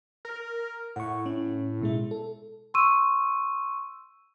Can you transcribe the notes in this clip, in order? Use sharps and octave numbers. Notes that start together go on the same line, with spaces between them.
A#4
A2 F#5 C#6
C#4
B2 G#3 E4
A4
C6 C#6 E6 D#7